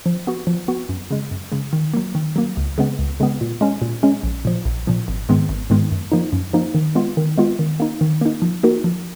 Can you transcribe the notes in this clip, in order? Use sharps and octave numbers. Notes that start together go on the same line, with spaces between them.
F3
B3 F#4
F3
B3 F#4
F#2
C#3 G#3
F#2
C#3 G#3
D#3
F#3 A#3
D#3
F#3 A#3
C#2
C#3 G#3 B3
C#2
C#3 G#3 B3
A#2
G#3 C#4
A#2
G#3 C#4
A#1
A#2 F3
A#1
A#2 F3
G#1
G#2 D#3 G#3 B3
G#1
G#2 D#3 G#3 B3
F#2
F3 A#3 D#4
F#2
F3 A#3 D#4
D#3
G#3 B3 F4
D#3
G#3 B3 F4
D#3
A#3 D#4
D#3
A#3 D#4
F3
A#3 D#4 F#4 A#4
F3